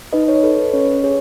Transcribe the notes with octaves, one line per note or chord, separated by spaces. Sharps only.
D#4 B4 D#5
C#5
A4 B4
B4
C#4 C#5
G#4 C#5